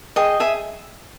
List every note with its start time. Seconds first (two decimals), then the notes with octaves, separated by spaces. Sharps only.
0.16 G#4 D#5 G5
0.40 G#4 E5 G#5